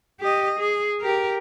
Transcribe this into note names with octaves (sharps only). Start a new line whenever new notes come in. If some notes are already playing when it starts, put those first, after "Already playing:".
G4 D#5
G#4
G4 A#4